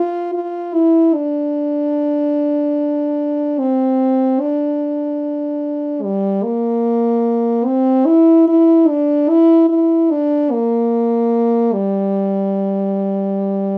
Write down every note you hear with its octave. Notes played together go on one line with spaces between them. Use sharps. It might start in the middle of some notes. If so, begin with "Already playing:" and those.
Already playing: F4
F4
E4
D4
C4
D4
G3
A#3
C4
E4
E4
D4
E4
E4
D4
A#3
G3